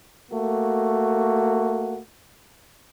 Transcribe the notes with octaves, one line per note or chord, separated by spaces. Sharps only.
A3 A#3 F#4